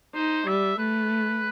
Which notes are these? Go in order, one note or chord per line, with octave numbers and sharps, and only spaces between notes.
D#4 C5
G3 E5
A3 B4